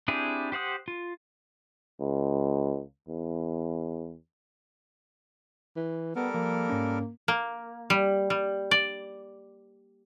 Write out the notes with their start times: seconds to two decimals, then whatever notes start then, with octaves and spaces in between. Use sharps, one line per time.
0.08 C4 D4 E4 G4 G#4
0.52 G4 C5 F#5 D#6
0.88 F4
2.00 C#2
3.09 E2
5.76 E3
6.16 G3 B3 A4 A#4
6.34 F3 A#3
6.69 G#2 C#4
7.28 A#3
7.90 G3
8.30 G3
8.71 D5